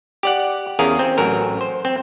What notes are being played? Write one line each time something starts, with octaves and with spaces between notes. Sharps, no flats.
G4 D5 F#5
E2 C#4 G#4 A#4 F5
C4
A1 F#3 A#4
C5
C4